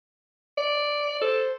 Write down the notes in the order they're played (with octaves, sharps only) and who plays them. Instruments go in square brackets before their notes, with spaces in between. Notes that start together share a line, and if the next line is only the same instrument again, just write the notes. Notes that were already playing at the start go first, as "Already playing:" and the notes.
[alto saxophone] D5
[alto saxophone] A4 [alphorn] C5